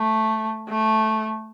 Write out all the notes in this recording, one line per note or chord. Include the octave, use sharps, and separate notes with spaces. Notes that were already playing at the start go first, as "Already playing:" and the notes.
Already playing: A3
A3